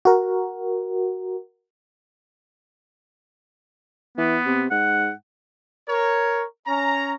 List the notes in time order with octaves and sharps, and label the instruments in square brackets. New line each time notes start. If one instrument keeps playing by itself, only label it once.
[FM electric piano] F#4 A#4
[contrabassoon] E3 [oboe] B3
[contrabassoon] C3
[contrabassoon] G#2 [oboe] F#5
[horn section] A#4 C#5
C#4 A#5